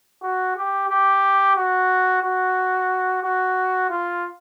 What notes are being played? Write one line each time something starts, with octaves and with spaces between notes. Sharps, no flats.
F#4
G4
G4
F#4
F#4
F#4
F4